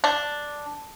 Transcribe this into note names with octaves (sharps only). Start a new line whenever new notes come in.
D4